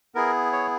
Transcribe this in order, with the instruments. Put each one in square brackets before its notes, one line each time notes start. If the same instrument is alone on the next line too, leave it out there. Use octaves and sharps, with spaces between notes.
[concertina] B3 E4 G#4 A#4
C#5